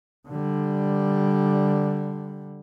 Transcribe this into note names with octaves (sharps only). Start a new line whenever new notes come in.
D3 G3